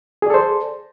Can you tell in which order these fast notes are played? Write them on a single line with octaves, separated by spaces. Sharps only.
G#4 D5 A4 C5